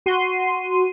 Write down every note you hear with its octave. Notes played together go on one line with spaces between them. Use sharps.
F#4 C6 D#7